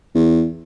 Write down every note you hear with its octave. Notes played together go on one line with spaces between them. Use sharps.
E2